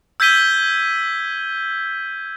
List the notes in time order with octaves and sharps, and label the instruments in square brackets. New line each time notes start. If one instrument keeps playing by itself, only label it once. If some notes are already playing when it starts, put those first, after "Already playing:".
[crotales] E6 G6 G#6 B6 D#7 G7